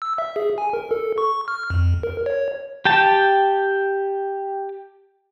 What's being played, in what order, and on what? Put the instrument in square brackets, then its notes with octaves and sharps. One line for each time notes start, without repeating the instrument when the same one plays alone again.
[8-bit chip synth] E6
E5
G#4
G#5
A#4
A4
C#6
F6
F2
A#4
C#5
[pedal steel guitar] G4 G5 A5